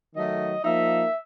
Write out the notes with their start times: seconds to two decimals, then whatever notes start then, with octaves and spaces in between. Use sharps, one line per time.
0.15 D#3 F#3 A3 D#5
0.64 F3 A#3 D#4 E5